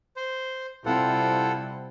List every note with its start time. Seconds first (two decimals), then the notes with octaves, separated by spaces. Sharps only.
0.16 C5
0.86 C3 G3 C4 E4 F4 A4 F#5